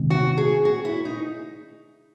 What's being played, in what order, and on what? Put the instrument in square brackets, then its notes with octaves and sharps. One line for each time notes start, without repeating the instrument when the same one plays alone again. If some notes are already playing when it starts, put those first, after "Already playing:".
Already playing: [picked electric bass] C3 D#3 G#3 C4
[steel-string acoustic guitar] F#4
G#4
F#4
E4
D#4